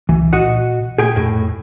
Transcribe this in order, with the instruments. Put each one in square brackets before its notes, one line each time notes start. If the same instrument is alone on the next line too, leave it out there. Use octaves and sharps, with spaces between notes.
[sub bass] C2 [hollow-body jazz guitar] E3
[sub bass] A#2 [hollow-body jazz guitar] F#4 D#5 F#5
[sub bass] A#2 [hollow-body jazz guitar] G#4 G5 G#5
[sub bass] F2 [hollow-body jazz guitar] A2